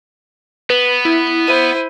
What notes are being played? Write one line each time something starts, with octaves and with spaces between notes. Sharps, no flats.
B3 B4
E4
E4 C5 D#7